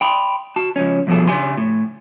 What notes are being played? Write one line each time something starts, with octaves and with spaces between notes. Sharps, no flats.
G5 B5 C6
F#4 A5
C#2 F3 C#4
C2 F2 B2 F3 G#4 A4
C#3 G4 G#5 C6
A2